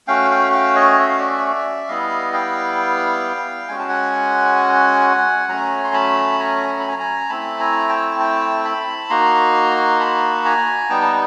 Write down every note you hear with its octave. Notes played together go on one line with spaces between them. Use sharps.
A3 C#4 F#4 F5 G5
F5 G5
F5 G5
C#5 D#5
E5
F5
D5 E5
G3 B3 E4 D#5 F5
F5 G5
G#3 C#4 F#4 G#5
A5
F#5 G#5
F#3 A3 C#4 G#5 A#5
C6
A5 B5
G#5 A#5
A#5
B5
G#5 A#5
G#5 A#5
A3 C4 E4 A5 B5
G#5 A#5
G5 A5
G5 A5
A5 B5
A#3 D#4 F#4 A#5 C6
A5 B5
G#5 A#5
G3 B3 D#4 G5 A5
A5